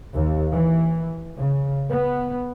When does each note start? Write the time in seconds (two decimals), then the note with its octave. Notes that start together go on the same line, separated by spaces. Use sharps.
0.15 D#2
0.52 E3
1.37 C#3
1.89 B3